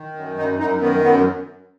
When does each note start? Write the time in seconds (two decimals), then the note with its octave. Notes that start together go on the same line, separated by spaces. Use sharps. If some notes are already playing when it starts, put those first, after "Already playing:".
Already playing: D#3
0.15 F#2
0.37 F#2 D#4
0.59 F#2 D#4
0.81 D#3 B3
1.04 F#2 B3